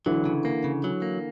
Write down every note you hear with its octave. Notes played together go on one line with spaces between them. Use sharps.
D3 E3 F#3
C#3
A#3
C#3
F#3
A#3